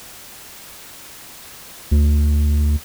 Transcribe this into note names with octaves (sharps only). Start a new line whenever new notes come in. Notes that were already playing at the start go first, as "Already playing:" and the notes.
D2